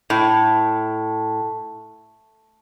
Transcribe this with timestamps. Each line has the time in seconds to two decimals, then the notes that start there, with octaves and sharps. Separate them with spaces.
0.10 A2